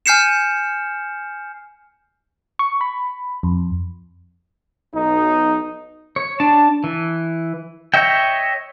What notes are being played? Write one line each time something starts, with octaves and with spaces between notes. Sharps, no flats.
G#5 F6 G6 C7 C#7 E7
C#6
B5
F2
B1 D#4
C#5
D4 A5
E3
C#5 D#5 E5 G5